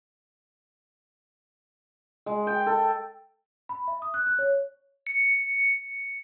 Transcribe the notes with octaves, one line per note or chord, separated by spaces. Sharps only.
G#3
G5
A4
B5
E5
D#6
F#6
F#6
C#5
C#7